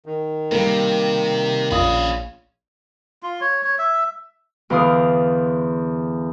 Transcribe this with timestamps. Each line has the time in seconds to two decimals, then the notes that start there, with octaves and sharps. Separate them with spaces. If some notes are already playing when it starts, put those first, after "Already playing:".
0.06 D#3
0.52 C3 G3 A#3
1.71 A#1 C#4 F4 B5 D#6
3.23 F4
3.41 C#5
3.64 C#5
3.79 E5
4.70 E2 D3 F5 D#6